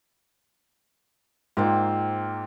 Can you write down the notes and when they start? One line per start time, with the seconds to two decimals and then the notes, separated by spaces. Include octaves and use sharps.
1.57 G#2 A#3 C4 F4